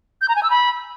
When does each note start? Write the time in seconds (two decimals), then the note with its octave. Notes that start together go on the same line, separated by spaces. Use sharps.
0.21 G6
0.29 A#5
0.36 G#5
0.43 E6
0.50 B5